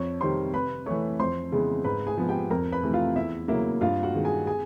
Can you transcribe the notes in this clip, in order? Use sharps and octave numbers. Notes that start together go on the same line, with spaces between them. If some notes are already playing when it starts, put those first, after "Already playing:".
Already playing: F2 C#5 C#6
C3 D#3 G3 C5 C6
C3 B4 B5
E3 A3 C#5 C#6
F2 C5 C6
C#3 E3 G#3 B3
G#2 B4 B5
G#4 G#5
F3 G#3 B3
G4 G5
F2 A#4 A#5
B4 B5
C3 E3 A3
F4 F5
E2 E4 E5
C#3 F#3 A#3 E4 E5
G2 F4 F5
F#4 F#5
D#3 G#3
G#4 G#5
G#4 G#5